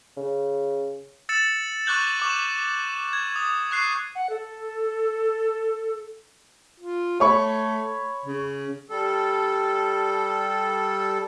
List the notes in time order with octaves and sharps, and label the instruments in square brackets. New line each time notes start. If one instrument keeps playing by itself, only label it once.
[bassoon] C#3
[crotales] E6 A6 C#7 E7
C#6 D6 F#6 G6 F#7
C#6 D6 E7
G#6
D#6
C#6 F#6 C7
[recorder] F#5
A4
[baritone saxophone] F4
[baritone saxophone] A3 [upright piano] C#5 B5 C#6
[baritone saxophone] C#3
[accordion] G3 A4